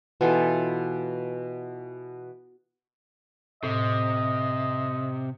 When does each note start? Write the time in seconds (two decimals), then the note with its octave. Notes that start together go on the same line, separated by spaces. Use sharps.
0.21 B2 E3 F4 A4
3.63 A2 C3 D#5